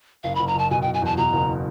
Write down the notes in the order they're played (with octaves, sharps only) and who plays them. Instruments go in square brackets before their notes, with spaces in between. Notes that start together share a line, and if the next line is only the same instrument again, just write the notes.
[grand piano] F#1 [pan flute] F5
[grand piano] F#1 [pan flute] B5
[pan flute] A#5
[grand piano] F#1 [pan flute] A5
[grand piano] B2 [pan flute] G#5
[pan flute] G5
[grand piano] F#1
[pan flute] G#5
[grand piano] E2 [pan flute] A5
[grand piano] B2 [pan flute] A#5
[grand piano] F#1